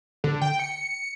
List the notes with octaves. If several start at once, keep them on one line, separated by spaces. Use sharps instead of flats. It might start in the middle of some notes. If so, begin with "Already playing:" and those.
D3
G5
C#7